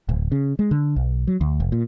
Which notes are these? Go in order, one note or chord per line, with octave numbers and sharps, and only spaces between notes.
D1
C#3
G#3
D3
B1
F#3
D2
F1
A#2